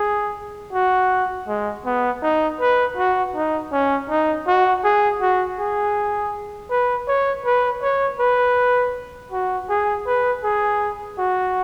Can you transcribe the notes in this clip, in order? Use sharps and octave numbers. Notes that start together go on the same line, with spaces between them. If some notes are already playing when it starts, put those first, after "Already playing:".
Already playing: G#4
F#4
G#3
B3
D#4
B4
F#4
D#4
C#4
D#4
F#4
G#4
F#4
G#4
B4
C#5
B4
C#5
B4
F#4
G#4
B4
G#4
F#4